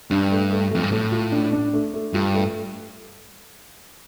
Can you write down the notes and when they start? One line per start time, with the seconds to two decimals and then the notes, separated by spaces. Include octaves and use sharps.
0.11 G2 D4
0.31 A3
0.51 A3
0.71 F2 A3
0.83 G2
0.92 A2 A3
1.12 F4
1.32 D4
1.53 D4
1.74 A3
1.94 A3
2.14 G2 F4
2.34 A3